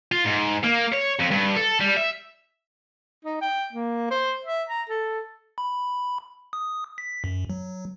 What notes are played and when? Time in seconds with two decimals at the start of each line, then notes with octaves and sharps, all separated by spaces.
0.12 F4
0.25 G#2
0.63 A#3
0.92 C#5
1.19 F2
1.31 G2
1.56 A4
1.80 G3
1.96 E5
3.25 D#4
3.42 G5
3.73 A#3
4.10 C5
4.45 E5
4.69 A#5
4.89 A4
5.58 B5
6.53 D#6
6.98 B6
7.24 F#2
7.50 F#3